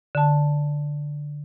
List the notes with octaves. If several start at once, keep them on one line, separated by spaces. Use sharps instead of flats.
D3 A5